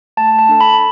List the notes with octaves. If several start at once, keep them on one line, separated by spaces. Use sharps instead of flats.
A3 A5
A5
D4 A4
B5